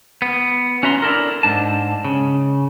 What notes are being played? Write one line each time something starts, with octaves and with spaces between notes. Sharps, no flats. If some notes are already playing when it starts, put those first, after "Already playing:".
B3
C#4 F#4 E5 A#5 C6
D4 E4 A4 A#4
G#2 D4 A5
C#3